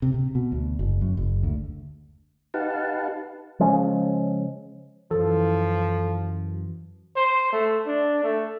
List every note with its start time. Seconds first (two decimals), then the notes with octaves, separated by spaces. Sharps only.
0.02 C3
0.14 C3
0.35 B2
0.52 D2
0.79 F#1
1.01 F#2
1.17 F#1
1.43 D2
2.54 D#4 G4 B4 F5 F#5 A5
3.59 C#3 F3 G#3 C#4
5.11 F#2 E3 F3 A4
7.16 C5
7.52 A3
7.87 D4
8.23 A3